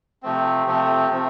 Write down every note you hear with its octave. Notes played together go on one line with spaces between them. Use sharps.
C3 F3 A3 C4
C3 F3 A3 C4
C3 F3 A3 C4